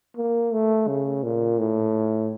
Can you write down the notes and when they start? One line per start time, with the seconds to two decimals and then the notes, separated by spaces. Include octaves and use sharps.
0.17 A#3
0.53 A3
0.87 C#3
1.23 A#2
1.59 A2